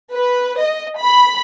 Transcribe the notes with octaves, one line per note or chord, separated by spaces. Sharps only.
B4
D#5
B5